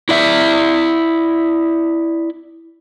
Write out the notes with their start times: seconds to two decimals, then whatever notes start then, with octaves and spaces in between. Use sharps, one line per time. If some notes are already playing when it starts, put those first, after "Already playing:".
0.09 E4 D5 E5